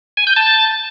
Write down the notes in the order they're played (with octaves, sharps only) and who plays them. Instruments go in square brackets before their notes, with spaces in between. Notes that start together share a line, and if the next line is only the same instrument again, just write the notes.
[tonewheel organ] G#5
G6
A5